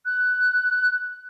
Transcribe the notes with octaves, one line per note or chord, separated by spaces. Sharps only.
F#6